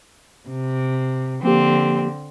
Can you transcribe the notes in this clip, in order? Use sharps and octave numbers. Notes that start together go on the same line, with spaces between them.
C3
D3 F3 A#3 C4 G4